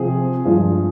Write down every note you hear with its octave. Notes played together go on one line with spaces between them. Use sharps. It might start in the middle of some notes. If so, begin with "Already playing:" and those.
Already playing: C3 F3 C4 G#4
G2 F3 G#3